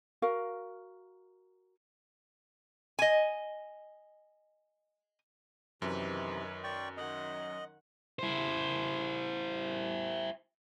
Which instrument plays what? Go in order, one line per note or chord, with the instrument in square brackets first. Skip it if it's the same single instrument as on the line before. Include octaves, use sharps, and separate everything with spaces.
[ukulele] F#4 A#4 F5
[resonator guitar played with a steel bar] D#5 G#5
[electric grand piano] F#2 [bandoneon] C3 E3 [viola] D#3 B4
[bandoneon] D5 G5 C#6
[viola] D#3 F#5 [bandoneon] D#5
[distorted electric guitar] E4 C5